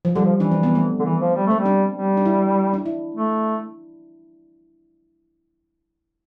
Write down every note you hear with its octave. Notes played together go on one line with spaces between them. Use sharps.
F3
D3 G3
F3
E3 D4
C4
B3
A3
D3
E3
F3
G3
A3 C4
G3
D4
G3
D4
E4
D4
E4
A3